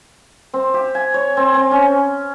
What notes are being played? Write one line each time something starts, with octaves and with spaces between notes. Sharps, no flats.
C4
G4
G#5
C#5
C4
C4
C#4